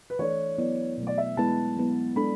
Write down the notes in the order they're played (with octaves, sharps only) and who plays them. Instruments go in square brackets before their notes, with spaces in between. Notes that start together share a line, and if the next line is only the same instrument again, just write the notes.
[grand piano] B4
[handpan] E3 A3 D4 A4 D5 [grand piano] C#5
[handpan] F#3 B3 E4 B4 D5
B2 F#3 A3
[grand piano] D5
E5
[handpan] G#3 B3 E4 B4 [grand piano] A5
[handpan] F#3 B3 E4
[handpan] G#3 D4 A4 [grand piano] B5